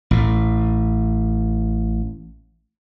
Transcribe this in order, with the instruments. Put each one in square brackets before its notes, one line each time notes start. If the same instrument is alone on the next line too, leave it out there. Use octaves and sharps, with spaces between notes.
[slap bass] A1 A2